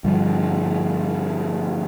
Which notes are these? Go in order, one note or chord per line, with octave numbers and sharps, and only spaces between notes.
G2 D3 F3